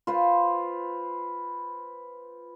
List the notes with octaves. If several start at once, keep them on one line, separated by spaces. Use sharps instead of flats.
F4 B4 C5